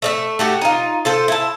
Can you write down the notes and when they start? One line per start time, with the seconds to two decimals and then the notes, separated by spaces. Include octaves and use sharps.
0.02 A3 D5 E5
0.39 A3 F#4 G4
0.61 D#4 F4
1.05 F4 A4 C5
1.28 E4 A5